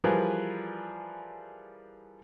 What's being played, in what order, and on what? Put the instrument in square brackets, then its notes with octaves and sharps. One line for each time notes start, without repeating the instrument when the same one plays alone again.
[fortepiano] E3 F3 G3 G#4 A#4 B4